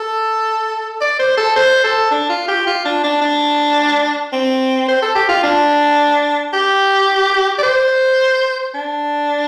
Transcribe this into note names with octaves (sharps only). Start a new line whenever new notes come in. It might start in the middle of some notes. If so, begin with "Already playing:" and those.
Already playing: A4
D5
C5
A4
C5
A4
D4
F4
G4
F4
D4
D4
D4
C4
C5
A4
G4
F4
D4
G4
D5
C5
D4